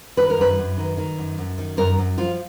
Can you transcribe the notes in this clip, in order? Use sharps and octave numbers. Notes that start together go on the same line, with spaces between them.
D#3 B4
A#4
F#2 B4
F#2
D#3
D#3
F#2
F#2
D#3
F#2 A#4
F#2
F3 F4